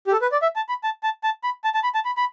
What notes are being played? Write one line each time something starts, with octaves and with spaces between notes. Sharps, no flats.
G4
A4
B4
D5
E5
A5
B5
A5
A5
A5
B5
A5
A5
B5
A5
B5
B5